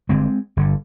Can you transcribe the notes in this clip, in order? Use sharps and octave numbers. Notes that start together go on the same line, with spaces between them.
G1 G2 D3 G#3 C4
G1 G2 D3